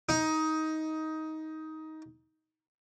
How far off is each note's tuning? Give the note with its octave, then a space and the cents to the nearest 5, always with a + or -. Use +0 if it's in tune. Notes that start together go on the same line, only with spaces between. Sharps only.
D#4 +15